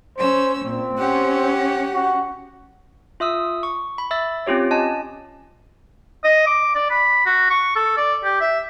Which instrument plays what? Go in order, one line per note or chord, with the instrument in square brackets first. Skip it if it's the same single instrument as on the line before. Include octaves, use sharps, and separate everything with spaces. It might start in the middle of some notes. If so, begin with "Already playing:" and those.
[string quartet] C#4 E6 [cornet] C5
[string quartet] A#2 [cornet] C4
[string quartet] C#4 G4 F#5
[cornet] F#4
[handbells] F4 E5 D#6 E6
C#6
B5
E5 E6 A6
C4 C#4 F4 G4 C#5
C#4 D#5 G#5 A5
[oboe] D#5
D6
D5
B5
F#4
C#6
A4
D5
G4
E5